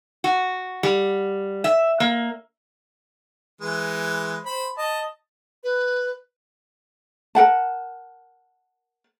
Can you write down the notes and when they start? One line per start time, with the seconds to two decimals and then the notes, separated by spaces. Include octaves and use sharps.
0.24 F#4
0.83 G3
1.64 E5
2.00 A#3
3.61 E3 G#3 B4
4.46 C5 B5
4.78 D#5 A5
5.64 B4
7.35 A#4 F#5 A5